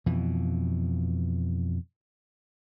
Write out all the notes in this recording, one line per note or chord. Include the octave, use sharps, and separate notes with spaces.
F2 B2 E3